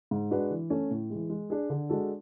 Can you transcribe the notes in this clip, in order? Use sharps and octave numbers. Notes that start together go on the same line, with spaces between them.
G#2
G#3 D4 F#4 B4
E3
A3 C#4
A2
E3 G#3
G#3
D4 G#4
D3
G#3 D4 F#4 A4